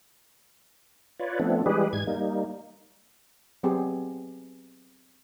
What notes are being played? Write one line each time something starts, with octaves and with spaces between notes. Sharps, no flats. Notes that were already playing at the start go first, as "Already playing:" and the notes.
F4 B4 C#5 D5
F3 A3 B3 C4 D4
E3 G3 G#3 G4 G#4 B4
G#2 G#6
G3 A#3 D#4
F#3 B3 C4 G4 G#4